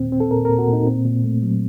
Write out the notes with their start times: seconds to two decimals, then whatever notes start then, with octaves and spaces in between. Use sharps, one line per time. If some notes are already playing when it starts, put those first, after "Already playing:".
Already playing: D#2 A#2 C4
0.12 C4
0.20 A4
0.31 A#2 A#4
0.45 A#4
0.49 A#2
0.59 F#4
0.68 A#2 D#4
0.87 C4
1.05 A#2
1.24 A3
1.43 F#3